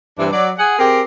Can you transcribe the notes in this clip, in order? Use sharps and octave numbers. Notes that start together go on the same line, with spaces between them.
G2 C3 E3 D4
F#3 D5
G#4 F#5
C4 G4 G#4 A#4